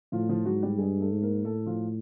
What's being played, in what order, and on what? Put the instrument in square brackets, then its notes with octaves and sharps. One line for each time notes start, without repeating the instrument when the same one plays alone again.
[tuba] A2 [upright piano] F3 F4
[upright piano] F3 F4
[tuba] G#2 [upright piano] F#3 F#4
[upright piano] G3 G4
[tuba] G2 [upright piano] G#3 G#4
[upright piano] A3 A4
[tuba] G#2
[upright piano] A#3 A#4
[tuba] A2 [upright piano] A3 A4
[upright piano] F3 F4